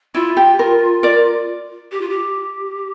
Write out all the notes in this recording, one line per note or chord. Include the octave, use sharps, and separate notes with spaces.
E4 F4
G4
A#4
A#4 D5
G4
F4
G4